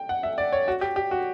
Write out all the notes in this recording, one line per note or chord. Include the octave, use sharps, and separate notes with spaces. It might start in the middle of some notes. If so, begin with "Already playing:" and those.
Already playing: G5
F#5
E5
D5
C#5
F#4
G4
G4
F#4